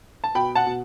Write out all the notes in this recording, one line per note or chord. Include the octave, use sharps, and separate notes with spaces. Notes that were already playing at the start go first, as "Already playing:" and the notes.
A5
B2 G5 B5
F#5 A5
B2